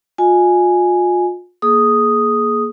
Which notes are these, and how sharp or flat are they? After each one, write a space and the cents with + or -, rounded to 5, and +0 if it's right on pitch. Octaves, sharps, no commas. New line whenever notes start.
F4 +35 D#5 +0 G#5 +5
A#3 +10 G#4 +25 D#6 +0